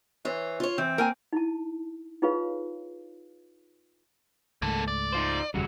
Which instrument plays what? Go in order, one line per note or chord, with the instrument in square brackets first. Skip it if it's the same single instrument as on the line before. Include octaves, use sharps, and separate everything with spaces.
[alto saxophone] E3 [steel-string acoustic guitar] C5 C#5
[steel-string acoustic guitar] F4 C#5
[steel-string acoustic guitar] E3 [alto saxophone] C4
[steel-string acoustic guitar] A#3 [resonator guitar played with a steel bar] A#4 G5 G#5
[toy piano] D#4 E4 A5
D#4 F4 G#4 B4 C#5 F5
[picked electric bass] C#2 G#2 A3 [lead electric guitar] A#3 A4
[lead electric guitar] D5
[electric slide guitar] D#4 F4 C5
[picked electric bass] F#1 D#2 C#3 [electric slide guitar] G3 G#3 F#4